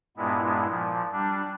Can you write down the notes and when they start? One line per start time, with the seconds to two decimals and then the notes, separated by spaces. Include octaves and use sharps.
0.17 G2 A#2 G#3 B3 E4
0.69 A#2 F3
1.12 G3 D4